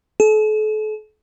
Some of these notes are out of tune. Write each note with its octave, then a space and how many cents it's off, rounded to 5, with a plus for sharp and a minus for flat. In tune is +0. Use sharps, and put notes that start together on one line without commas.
A4 -40